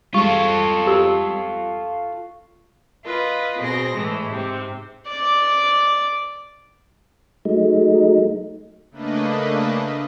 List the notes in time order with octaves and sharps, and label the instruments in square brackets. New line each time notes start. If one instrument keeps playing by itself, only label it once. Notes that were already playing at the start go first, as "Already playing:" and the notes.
[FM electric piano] G3 G#3 [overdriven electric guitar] F4 A4 [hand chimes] C#6
[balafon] G4
[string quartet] F4 B4 D#5
B2 C4 G#4 C6 A#6
A2 E3 G#3 A3
G#2 C3 C4
[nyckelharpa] D5
[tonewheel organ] F#3 G#3 A3 D#4
[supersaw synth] C#3 A3 A#3 D4 B4 D#5